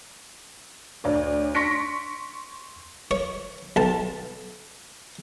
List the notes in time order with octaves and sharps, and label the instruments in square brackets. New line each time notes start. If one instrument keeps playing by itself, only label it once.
[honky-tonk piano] D2 C#5 D5
C6 C#6 A#6 B6 C#7 D7
[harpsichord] C#5
B1 A5